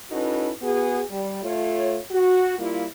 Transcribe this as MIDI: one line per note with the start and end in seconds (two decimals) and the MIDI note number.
0.11 0.51 61
0.11 0.51 63
0.11 0.51 64
0.11 0.51 66
0.11 0.51 69
0.11 0.51 71
0.62 1.00 59
0.62 1.00 66
0.62 1.00 68
1.10 1.42 55
1.43 1.97 57
1.43 1.97 65
1.43 1.97 73
2.11 2.57 66
2.58 2.84 55
2.58 2.84 58
2.58 2.84 64
2.58 2.84 65